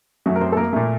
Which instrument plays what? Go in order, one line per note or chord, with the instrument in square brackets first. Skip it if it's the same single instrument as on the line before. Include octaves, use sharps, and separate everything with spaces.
[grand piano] F#2 F#3 A3 F#4
A#4
C4 C5
A4
A#3 A#4
A#2 A3